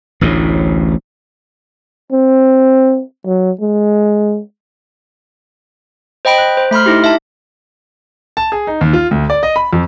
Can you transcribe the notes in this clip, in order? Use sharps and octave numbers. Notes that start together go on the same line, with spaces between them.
A1 D2 A2
C4
F#3
G#3
C5 D#5 G5 B5 D7
F#6
C5
A3 B5 C6 F6
D#4 E4 G4
E5 A5
A5
G#4
D#4
D#2
F4
D2
D5
D#5
B5
F2